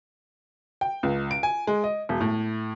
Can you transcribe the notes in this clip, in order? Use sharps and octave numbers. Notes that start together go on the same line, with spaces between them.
G5
C#2
D7
G#5
G#3
D#5
E1
A2